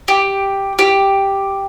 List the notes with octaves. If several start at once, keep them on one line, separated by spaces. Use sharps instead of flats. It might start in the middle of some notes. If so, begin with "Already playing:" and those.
G4
G4